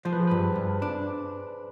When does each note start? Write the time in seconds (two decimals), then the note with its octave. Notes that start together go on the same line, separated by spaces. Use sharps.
0.05 F3 C5
0.13 B4
0.20 G#4
0.27 G2 B4
0.55 G2
0.82 D4